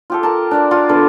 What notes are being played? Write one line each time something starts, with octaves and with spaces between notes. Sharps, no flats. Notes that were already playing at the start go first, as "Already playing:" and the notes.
F4 G4 A4
A#4 A5
D4 A#4 D5
F4 F#5
D3 B3